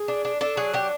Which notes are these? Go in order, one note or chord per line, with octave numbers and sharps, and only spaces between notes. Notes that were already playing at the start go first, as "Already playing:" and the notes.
Already playing: G#4
D4
D4
D4 A4
F#3 G#4
D4 G4